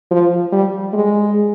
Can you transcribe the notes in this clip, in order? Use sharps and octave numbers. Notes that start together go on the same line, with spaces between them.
F3
G3
G#3